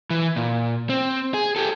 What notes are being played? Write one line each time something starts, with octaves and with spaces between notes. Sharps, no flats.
E3
A#2
C4
G#4
G4 A4